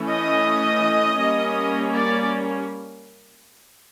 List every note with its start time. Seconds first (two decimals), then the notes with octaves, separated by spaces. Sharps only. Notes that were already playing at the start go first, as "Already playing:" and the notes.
Already playing: E3 A3 C#4
0.10 D#5
1.19 G3 A#3 C#4
1.93 D5